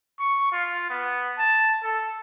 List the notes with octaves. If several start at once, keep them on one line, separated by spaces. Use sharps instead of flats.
C#6
F4
B3
A5
A4